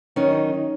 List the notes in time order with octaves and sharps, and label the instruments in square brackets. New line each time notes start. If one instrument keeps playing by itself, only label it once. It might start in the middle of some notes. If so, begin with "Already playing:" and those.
[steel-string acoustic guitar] D#3 F#3 D#4 [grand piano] C#4